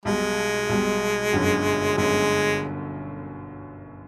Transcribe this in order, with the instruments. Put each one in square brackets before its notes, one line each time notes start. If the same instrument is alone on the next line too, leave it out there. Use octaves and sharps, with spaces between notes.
[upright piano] B1 B2 G3 [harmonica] G#3
[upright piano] B1 B2 G3
G1 F#2 D3
[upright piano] G1 F#2 D3 [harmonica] G#3